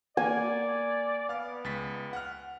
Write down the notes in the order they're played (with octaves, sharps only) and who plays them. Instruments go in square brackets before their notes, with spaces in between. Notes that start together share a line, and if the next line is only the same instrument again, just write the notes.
[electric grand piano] A#3 [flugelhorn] D5 [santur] G#5
[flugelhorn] B3 [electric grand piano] F5 F6
[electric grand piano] C#2 A6 B6
F#5 F6